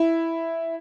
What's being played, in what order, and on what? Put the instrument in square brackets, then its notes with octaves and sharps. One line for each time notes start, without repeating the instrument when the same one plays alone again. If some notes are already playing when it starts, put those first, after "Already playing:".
Already playing: [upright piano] E4